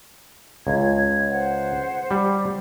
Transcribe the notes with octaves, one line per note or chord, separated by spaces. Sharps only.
C#2 G#6
C5 F#5
G3